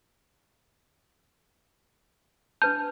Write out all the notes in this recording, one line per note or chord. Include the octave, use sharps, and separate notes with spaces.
D4 B4 A5 G6